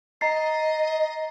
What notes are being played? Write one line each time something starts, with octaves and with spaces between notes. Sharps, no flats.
D#5 A#5 A6 C7